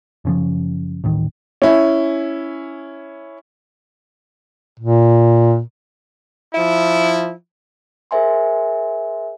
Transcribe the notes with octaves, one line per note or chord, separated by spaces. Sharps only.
F#1 C#3 F3
D1 A1 D#3
C#4 E4
A#2
F3 E4
G#4 A#4 C5 E5 G#5 C6